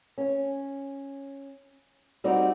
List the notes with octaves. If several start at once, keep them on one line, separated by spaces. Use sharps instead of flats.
C#4
G3 C4 D#4 F#4 D5